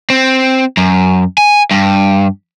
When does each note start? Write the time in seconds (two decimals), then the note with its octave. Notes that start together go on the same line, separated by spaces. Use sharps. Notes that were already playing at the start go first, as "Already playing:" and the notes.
0.10 C4
0.77 F#2
1.38 G#5
1.71 G2